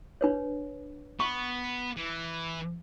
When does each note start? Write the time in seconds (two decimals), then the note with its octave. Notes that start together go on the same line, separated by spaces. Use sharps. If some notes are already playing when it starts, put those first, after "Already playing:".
0.21 D4 B4 C#5
1.20 B3 C#6
1.97 E3